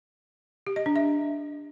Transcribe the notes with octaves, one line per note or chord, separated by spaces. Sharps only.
G4
D#5
D4
E5